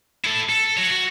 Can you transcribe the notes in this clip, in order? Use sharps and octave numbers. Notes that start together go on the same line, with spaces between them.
E4 A4
A4
F#4 C#5
F#4